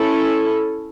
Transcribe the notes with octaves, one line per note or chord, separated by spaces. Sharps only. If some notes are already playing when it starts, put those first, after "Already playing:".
Already playing: C#4 E4 A4